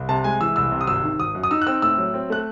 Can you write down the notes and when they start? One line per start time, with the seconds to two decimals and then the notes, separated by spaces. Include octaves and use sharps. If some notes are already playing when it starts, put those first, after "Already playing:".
Already playing: C2
0.09 C3 A5
0.24 G#3 G#5
0.41 E3 E6
0.56 C2 E6
0.72 C3
0.81 D#6
0.87 G#1 E6
1.04 D#3
1.19 G#1 D#6
1.35 F#2
1.43 D#6
1.51 D#4 E6
1.62 F#6
1.66 C4 E6
1.82 A2 E6
1.98 F#3
2.14 C4
2.30 A3 F#6